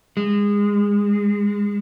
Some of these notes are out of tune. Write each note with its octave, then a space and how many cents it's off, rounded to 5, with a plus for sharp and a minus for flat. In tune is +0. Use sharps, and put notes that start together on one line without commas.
G#3 -25